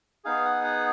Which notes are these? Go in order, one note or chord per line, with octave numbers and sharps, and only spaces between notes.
B3 D#4 G#4 F5
F#5
F#5